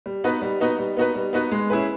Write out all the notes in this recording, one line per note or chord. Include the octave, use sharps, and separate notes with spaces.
G3
B3 D#4 F#4 B4
G3
B3 D#4 F#4 B4
G3
B3 D#4 F#4 B4
G3
B3 D#4 F#4 B4
G#3
C#4 E4 G#4 B4